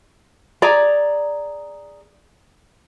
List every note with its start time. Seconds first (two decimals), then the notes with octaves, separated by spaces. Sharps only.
0.62 G#4 D5 A#5